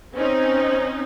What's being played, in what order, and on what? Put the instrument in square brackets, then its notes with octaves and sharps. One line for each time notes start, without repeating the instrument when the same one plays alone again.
[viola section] C4 C#4 D#4 [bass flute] C5